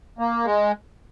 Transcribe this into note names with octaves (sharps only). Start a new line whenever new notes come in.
A#3
G#3